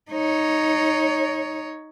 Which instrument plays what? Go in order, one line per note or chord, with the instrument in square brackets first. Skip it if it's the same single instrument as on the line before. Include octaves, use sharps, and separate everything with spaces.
[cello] D#4 C#5